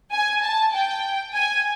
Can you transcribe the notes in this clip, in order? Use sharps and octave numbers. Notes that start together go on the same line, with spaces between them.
G#5
A5
G5
G#5